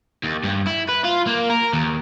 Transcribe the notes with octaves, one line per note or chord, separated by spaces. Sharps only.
D#2
G2
E4
B4
F4
A#3
A#4
D#2